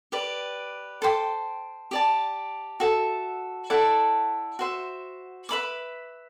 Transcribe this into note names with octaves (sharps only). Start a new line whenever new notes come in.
G4 B4 D5
A4 C5 G5 D6
G4 D5 A5
F#4 A4 E5
E4 A4 D5 F#5
F#4 C5 E5
B4 E5 B5 D6